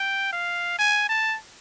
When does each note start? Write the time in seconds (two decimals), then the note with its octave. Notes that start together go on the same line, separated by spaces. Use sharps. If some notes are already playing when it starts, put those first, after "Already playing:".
Already playing: G5
0.32 F5
0.79 G#5
1.09 A5